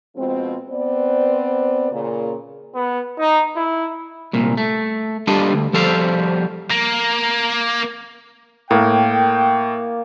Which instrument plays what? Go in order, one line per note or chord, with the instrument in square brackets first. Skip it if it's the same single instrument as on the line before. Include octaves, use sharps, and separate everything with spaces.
[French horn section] B2 F3 G#3 C4
B3 C4 B4 C5 D5
A#2 C#3
[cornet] B3
D#4
E4
[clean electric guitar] C2 A#2
A3
G3 D4 F4 A4 D#5
D2
F3 G3 A4 C5 F5
[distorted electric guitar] A#3
[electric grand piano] A2 [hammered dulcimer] A#3 [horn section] G5